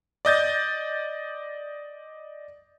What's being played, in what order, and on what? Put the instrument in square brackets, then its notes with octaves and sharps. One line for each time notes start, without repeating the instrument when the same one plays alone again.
[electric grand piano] D5 D#5 G6 A6